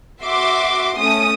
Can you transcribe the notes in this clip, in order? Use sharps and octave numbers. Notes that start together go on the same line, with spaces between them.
F#4 E5 C6 D6
A3 C#4 D#6